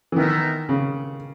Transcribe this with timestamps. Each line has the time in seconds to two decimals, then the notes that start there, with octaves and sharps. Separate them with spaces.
0.12 E3
0.16 D#3 B3 D#4 A#4 E5
0.69 C#3